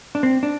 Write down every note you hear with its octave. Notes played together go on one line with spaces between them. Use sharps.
D4
C4
D4